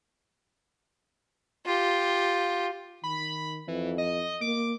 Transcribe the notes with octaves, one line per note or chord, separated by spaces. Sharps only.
F4 G4
D#3 B5
F2 E3
D#5
A#3 D6